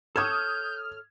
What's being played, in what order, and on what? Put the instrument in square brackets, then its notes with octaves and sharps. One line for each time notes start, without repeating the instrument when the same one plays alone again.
[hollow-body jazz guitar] A4 C#5 [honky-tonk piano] D#6 G#6 E7 [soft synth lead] F6 [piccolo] G6